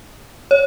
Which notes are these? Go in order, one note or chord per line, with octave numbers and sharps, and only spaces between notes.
C#5